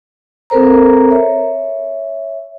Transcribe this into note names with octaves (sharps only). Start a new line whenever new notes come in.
C4 A4 A#4 C5 A#5
C#5 E5